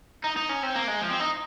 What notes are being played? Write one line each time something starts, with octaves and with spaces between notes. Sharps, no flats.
D#4
D#4
C#4
C4
A#3
G#3
F3
C4
D#4